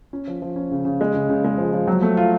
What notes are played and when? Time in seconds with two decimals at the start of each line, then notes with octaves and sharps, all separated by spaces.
0.13 C#4
0.27 F3
0.42 F3
0.56 C#4
0.71 C#3
0.85 C#3
1.01 G#3
1.14 C#3
1.29 C#3
1.44 G#3
1.58 F3
1.73 F3
1.88 F#3
2.02 A3
2.17 F4